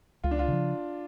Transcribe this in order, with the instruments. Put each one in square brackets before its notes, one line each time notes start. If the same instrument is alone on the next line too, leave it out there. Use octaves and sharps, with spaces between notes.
[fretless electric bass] C#2 [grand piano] F4
[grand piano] D4
F4
[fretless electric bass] C#3 F3